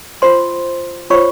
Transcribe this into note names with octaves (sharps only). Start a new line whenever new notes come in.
F4 C5 C6
F4 C5 C#5 C#6